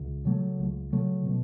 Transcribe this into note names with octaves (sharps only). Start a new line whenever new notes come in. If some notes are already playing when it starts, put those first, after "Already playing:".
Already playing: C#2
C#3 F#3 A3
C#2
C#3 F#3 A3
B2